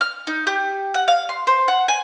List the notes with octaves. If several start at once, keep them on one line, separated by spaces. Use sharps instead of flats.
F6
D#4
G4
F#5
F5
C6
C5
F#5
G#5